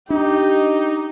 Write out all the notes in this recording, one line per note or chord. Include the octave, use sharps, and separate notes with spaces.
D4 D#4 G4